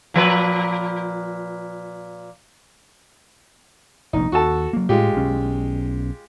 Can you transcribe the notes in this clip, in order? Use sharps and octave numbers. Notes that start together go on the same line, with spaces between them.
A#2 F3 B4
F1 A#1 D#2 D#4
D#2 F#4 A4 A5
F#3 A#3
A2 G#3 F4 G4
B1 C#4